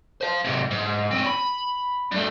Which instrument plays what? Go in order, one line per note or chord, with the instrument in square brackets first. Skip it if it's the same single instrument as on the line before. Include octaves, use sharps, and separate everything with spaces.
[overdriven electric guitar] C5 F5
G#2 C3
G#2
C4 C#4
B5
G2 A3